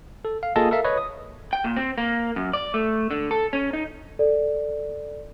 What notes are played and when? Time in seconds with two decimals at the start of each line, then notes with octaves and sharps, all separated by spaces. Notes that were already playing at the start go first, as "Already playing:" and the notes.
0.25 A4
0.43 F5
0.56 A#3 F4 G#4 A4 D#5 A5
0.71 A4 A#4 E5 F5
0.84 B4 C#5 D#5
0.98 D#6
1.53 G5
1.64 A#2
1.76 C4
1.98 A#3
2.36 F#2
2.53 D5
2.74 A3
3.11 D3
3.31 A4
3.53 C#4
3.73 D#4
4.19 A4 D5